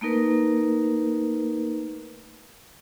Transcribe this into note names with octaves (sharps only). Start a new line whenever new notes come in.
A3 A#3 D#4 A#4 B4